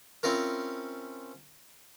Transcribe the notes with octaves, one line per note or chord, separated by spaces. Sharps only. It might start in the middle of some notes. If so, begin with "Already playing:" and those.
C4 C#4 E4 F4 A#4